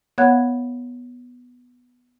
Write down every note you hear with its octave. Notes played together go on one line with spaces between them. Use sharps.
B3 C#5 F5 F#5 F#6 G#6